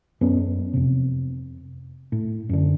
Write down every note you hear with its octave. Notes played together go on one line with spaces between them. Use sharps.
F#2 B3 C#4
F2 C3
A2
F#2 D3